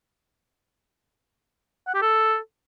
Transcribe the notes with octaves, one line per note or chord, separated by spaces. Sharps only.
F#5
G4
A4